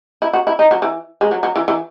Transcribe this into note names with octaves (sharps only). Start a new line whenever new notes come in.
E4
F#4
E4
D#4
F#3
E3
G#3
F#3
F#3
E3
E3